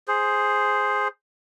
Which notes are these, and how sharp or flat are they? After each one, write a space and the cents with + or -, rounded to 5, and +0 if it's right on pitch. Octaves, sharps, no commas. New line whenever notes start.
G#4 +0 C5 +0